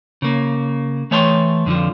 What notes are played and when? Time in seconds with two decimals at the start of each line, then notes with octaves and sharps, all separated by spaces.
0.22 C#3 A#3
1.11 E3 A3 C#5 G5 A5 C6
1.66 F2 D3 D#3 F3